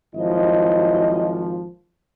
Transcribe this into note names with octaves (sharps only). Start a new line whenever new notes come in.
G#1 F3 F#3 E4 D#5